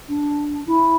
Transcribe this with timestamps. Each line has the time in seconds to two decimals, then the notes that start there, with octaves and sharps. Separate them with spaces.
0.09 D4
0.67 E4